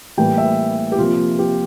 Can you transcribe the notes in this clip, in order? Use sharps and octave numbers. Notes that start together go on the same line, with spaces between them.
A2 E3 G3 A#3 G5
E5
G4
C3 F3 A#3 F4
G4